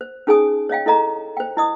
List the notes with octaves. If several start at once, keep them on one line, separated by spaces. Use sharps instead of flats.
C5
C#4 D#4 G#4 C#5 G#5 D#6
C#5 D#5 F5 G5
E4 A4 D#5 A#5
C5 G5
E4 D#5 D#6